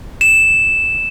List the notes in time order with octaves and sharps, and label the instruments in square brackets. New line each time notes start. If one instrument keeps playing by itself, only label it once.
[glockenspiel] E7